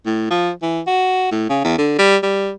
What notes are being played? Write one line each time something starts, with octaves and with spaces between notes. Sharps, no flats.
A2
F3
E3
F#4
A2
C#3
E2
D3
G3
G3